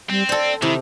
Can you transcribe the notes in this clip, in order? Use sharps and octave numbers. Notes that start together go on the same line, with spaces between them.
G3 C4
A4 C5 D5
C3 D#3 E4